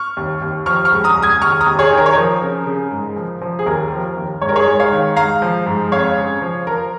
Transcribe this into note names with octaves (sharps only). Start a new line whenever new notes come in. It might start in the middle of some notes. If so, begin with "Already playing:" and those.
Already playing: C#6 F6
D#2
D#2
F3 C#6 F6
C#6 F6
C#2
A#5 D#6
C#2
D#6 G#6
D#2 C#6 F6
A#5 D#6
D#2
G#4 C#5
D#3
A#4
C#5
F3 A#4
C#3
C#3
G#2
F3
F3
G#4
D#2 A#4
F3
D#2
G#2 C#5
A#4
G#4 C#5
G#2
C#5 F5
D#3
G#2 F5 A#5
F3
G#2
F2 C#5 F5
C#3
F3
F3 A#4